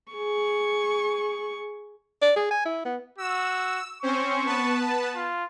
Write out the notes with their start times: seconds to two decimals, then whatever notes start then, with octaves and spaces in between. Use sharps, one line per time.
0.12 G#4 C#6
2.22 D5
2.36 G#4
2.50 G#5
2.65 E4
2.85 B3
3.18 F#4 E6
4.02 C4 C#4 C5 C#6
4.44 B3 B4 A5
5.15 F4